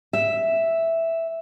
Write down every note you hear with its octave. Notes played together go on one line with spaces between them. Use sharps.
E5